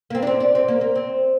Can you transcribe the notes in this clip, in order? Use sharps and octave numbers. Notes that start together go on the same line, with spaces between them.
A#3
C4
D4
C4
D4
C4
A#3
A#3
C4